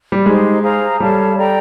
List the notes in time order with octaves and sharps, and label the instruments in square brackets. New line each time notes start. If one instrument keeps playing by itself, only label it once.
[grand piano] G3
[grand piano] G#3 [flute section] D#4 G4 C5
[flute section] G#4 C5 F5 A#5
[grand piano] G3 [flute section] A4 C#5 F5 A5
[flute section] A4 D5 G5 A#5